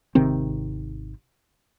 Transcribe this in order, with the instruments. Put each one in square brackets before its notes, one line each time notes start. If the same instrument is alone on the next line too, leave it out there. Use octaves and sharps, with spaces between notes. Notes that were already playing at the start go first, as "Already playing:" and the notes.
[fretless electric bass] G#1 C3 D#3 C4